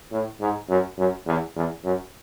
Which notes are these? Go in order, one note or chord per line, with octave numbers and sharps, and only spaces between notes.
A2
G#2
F#2
F#2
E2
E2
F#2